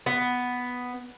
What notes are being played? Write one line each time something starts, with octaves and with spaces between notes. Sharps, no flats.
B3